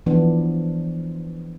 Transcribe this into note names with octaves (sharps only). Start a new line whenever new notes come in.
E3 F3 B3 D4